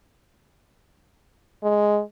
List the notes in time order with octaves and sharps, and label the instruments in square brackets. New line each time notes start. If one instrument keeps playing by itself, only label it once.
[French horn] G#3